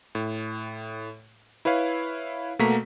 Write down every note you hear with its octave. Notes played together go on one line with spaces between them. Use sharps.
A2
E4 B4 C#5 F5
B2 A3 A#3 F#4 A#5 B6